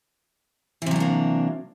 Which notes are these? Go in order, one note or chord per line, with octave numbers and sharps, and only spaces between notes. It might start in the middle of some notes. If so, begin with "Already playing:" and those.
C3 E3 F#3 A#3 D4